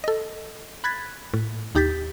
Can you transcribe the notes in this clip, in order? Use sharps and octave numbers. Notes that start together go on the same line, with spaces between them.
A4 D#5
B5 F#6 G#6 A6 B6
A2
D#2 D#4 G4 G6 A6 B6